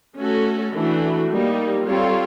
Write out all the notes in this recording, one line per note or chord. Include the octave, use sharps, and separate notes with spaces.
A3 C#4 F#4 A4
E3 A3 D4 F#4
G3 A#3 D#4
G3 C4 F4 A4 C#5